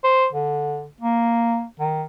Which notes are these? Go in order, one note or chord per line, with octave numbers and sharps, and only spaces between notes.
C5
D3
A#3
D#3